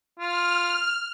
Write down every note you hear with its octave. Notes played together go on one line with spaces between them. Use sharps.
F4 F6